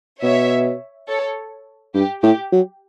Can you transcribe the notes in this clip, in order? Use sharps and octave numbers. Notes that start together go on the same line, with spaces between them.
B2 C#5 E5
A4 C#5
G2 G4
A2 G4
F#3